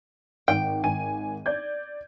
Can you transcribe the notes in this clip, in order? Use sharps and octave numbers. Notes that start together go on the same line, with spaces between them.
G#1 G5
G#1 G#5 D#7
D5 G6 G#6